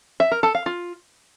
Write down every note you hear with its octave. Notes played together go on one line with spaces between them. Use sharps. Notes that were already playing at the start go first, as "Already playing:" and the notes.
E5
A#4
A4
F5
F4